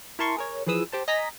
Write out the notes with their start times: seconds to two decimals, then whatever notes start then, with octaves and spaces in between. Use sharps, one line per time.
0.19 E4 A#4 A5 C6 C#6
0.37 G#4 A#4 C#5
0.66 E3 F3 G#4 B4 D#6 E6
0.92 G4 C5 A5
1.08 D#5 G#5 A#5 A#6 B6